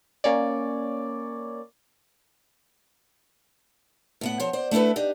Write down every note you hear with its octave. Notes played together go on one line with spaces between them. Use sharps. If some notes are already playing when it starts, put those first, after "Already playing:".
A#3 C#4 C#5 D5
A2 B3 F#5
F3 C5 C#5
C5 D5
A3 D4 E4 A4 B4
D4 D#4 G4